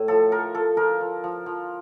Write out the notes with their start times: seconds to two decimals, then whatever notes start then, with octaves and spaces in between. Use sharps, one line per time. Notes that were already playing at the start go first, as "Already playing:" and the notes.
Already playing: A2
0.08 F3 A4
0.32 F3 A#4
0.55 F3 A4
0.77 F3 A#4
1.01 F3
1.24 F3
1.46 F3